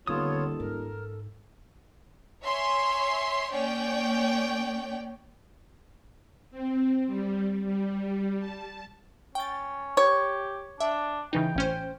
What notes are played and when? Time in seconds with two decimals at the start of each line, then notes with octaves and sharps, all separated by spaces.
0.07 D#1 D3 B3 F4 A4 C#5 D#6
0.60 G#2 A#4
2.43 C#5 E5 G#5 C6
3.50 A#3 C#4 C#5 D5 G5
6.51 C4
7.07 G3
7.65 G3
8.40 A5
9.35 C#4 G5 A6
9.97 G4 C#5
10.80 D4 E5
11.33 C#3 E3 D#4 G5
11.56 A1 C#4 C5